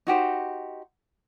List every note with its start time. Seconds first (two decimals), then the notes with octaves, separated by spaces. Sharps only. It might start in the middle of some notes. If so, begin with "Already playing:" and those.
0.07 D#4 F#4 G4 C5